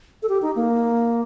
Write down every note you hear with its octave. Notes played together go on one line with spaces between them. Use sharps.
A4
G4
D#4
A#3